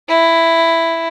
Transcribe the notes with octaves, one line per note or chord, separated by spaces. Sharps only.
E4